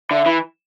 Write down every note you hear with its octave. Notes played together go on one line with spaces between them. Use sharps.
D3 E5
E3